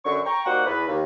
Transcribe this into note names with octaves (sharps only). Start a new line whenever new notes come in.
F#2 D3 C#6
G5 A#5 C#6
G3 A#3 D#4 F#4 C5 F#5
E2 B4
D#2